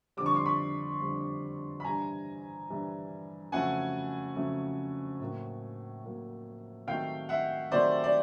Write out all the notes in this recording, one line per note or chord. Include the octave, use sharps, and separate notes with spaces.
F2 D3 G3 D6
C#6
C6 D6
B5 C#6
F2 D3 G3
B5
G2 E3 G3 G#5 A#5
G2 E3 G3
F2 C#3 F#3 A3 F#5 G#5
F2 C#3 F#3 A3
A2 F#3 A#3
A2 F#3 A#3
C3 D#3 F#3 A3 F5 G5
E5 F#5
C3 D#3 F#3 A3 C5 D5
D5